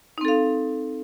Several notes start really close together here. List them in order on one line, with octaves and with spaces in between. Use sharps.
D#4 C4 A4 F5